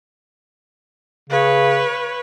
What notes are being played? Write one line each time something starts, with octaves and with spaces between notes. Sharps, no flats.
C#3 B4 C#5